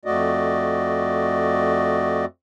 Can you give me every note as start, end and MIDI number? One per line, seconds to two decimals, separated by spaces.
0.05 2.25 41
0.05 2.25 57
0.05 2.25 66
0.05 2.25 74
0.05 2.25 75